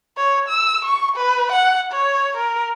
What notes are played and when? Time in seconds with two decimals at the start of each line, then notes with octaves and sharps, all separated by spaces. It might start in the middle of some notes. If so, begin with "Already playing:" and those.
0.17 C#5
0.49 E6
0.84 C#6
1.16 B4
1.52 F#5
1.91 C#5
2.37 A#4